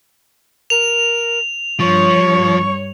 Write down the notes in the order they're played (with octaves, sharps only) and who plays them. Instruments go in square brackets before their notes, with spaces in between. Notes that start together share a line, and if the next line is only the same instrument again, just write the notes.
[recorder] A#4 [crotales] F7
[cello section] G2 C#5 [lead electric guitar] F3 [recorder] C#6